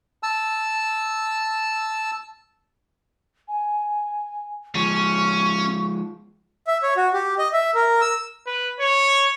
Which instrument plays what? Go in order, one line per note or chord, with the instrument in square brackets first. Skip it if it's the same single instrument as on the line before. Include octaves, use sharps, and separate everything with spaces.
[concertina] A5 E6
[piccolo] G#5
[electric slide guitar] F3 G#3 [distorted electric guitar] C#4 [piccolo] C#6
[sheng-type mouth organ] E5
C#5
F#4
G4
D#5
E5
A#4
E6
[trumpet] B4
C#5